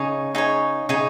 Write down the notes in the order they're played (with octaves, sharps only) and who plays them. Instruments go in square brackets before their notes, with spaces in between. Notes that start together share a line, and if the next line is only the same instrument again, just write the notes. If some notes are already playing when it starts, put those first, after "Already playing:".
Already playing: [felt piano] C#3 [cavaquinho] D#4 G#4 C#5
[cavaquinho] D#4 G#4 C#5
[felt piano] C#3 [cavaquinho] D#4 G#4 C#5